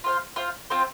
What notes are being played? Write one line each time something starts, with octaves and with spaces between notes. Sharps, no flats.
F4 C5 F5
F4 C5 F5
C4 F4 C5